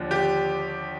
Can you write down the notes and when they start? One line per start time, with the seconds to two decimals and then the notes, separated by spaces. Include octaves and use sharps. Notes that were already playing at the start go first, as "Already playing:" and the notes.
Already playing: D#2 D3 F3
0.11 G4